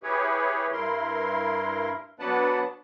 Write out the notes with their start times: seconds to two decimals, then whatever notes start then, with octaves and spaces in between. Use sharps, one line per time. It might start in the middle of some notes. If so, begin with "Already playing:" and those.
0.03 E4 G4 G#4 B4 C#5
0.73 G2 E4 A#4 C6
2.20 F#3 B3 D4 B4 F#5 A5